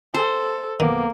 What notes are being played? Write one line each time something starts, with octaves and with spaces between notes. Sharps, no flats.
A4 C5
B1 D#3 A#3 B3 D6